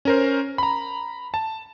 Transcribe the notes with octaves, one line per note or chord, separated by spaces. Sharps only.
C#4 A#4 C5
A#5 B5
A5